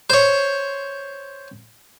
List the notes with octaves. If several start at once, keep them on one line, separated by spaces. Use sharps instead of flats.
C5 C#5